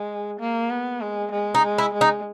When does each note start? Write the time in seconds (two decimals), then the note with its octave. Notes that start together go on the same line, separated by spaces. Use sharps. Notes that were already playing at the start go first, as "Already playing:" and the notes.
Already playing: G#3
0.40 A#3
0.70 B3
1.01 G#3
1.32 G#3
1.55 D#4
1.63 G#3
1.78 E4
1.94 G#3
2.01 D#4